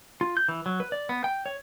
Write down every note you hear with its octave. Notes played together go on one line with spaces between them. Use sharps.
F4
G6
E3
F#3
B4
D5
B3
G5
C#5